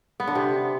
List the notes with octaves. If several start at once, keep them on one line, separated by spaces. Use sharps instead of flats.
B3
D3
C3